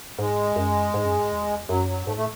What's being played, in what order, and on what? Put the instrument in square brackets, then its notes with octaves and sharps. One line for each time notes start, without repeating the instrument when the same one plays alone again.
[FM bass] G#2 [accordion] G#3
[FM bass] F#2
G#2
F#2
G#2
E2
[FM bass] F#2 [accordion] F#3
[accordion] F#3
[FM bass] G#2 [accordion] A3
[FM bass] A2 [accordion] A3